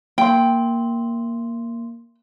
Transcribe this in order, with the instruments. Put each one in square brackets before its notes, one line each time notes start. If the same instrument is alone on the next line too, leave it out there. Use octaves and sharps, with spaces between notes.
[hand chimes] A#3 C6 [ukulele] G5